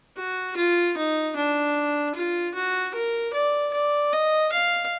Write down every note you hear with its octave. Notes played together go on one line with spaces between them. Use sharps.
F#4
F4
D#4
D4
F4
F#4
A#4
D5
D5
D#5
F5